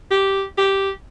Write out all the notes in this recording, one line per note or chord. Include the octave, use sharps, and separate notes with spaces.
G4
G4